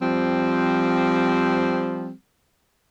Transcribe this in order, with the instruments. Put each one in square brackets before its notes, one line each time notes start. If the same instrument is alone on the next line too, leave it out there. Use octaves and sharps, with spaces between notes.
[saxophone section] F3 G3 C4